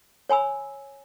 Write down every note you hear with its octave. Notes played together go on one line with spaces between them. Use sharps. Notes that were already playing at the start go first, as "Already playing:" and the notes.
C#5 G#5 B5 E6